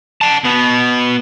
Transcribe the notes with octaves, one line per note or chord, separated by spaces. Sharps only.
F#5 A5
B2 B3